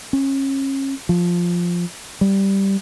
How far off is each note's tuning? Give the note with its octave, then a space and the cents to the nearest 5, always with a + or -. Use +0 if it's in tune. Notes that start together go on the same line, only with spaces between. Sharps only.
C#4 -30
F3 +0
G3 -5